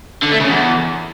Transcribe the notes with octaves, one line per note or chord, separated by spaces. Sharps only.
D3
A3
C#3
E2